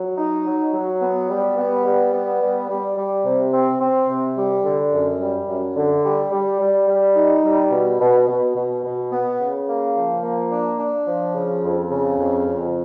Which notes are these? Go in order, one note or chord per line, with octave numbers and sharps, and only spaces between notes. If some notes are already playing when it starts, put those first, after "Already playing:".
Already playing: F#3
D#4
F#3
F#3
B3
G3
B3
G3
B3
G3
G3
G3
C3
C4
C4
C3
G3
D3
F#2
G3
F#2
D3
G3
G3
G3
G3
D#4
G3
B2
B2
B2
B2
B2
B3
C#3
A#3
F3
A#3
D4
D4
F3
C#3
F2
C#3
F2
F2